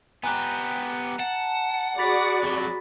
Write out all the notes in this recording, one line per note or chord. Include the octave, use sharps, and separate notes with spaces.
B3 G4 G#5 A#5 F#6
F#5 A5
F#4 G#4 D5 B5 A6 B6
F2 F#3